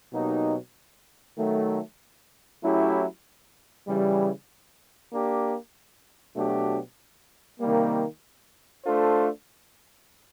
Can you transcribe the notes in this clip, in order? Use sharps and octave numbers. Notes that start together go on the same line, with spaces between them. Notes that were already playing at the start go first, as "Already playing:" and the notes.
B2 F#3 A#3 D#4 G4
D#3 F#3 A3
F#3 A3 C#4 E4 G4
C#3 E3 G3
A#3 D4 G4
B2 F#3 A3 D4 G4
C3 D#3 G3 A#3
A3 D4 F4 A4 C5